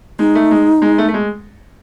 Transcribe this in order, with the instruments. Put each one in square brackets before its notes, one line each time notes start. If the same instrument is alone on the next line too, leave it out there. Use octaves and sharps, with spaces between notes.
[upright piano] G#3 [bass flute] D#4
[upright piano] A3
G#3
G#3
A3
A3
G#3